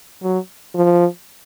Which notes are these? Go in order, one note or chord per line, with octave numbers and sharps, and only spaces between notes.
F#3
F3